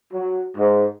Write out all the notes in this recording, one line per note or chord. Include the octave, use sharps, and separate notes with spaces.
F#3
G#2